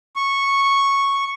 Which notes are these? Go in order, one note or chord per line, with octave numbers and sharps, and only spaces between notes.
C#6